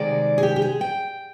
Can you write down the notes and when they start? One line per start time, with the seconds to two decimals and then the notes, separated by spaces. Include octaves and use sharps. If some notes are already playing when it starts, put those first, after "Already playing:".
Already playing: C3 D#3 G#3 D5
0.38 G#4
0.43 G4
0.56 G4
0.62 G#4
0.81 G5